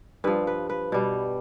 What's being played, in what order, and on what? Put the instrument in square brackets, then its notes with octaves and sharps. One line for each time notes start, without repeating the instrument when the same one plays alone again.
[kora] G2 F3 B4
B4
B4
B2 G3